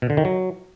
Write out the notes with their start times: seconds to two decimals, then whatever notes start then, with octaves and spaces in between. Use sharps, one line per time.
0.02 B2
0.10 D3
0.17 D#3
0.25 F#3